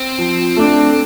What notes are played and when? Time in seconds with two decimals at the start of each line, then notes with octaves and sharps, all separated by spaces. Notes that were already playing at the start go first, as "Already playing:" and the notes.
Already playing: C4
0.18 F3
0.56 A3 D4